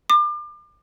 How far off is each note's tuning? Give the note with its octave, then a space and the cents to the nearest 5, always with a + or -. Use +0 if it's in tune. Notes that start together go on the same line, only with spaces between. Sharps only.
D6 +35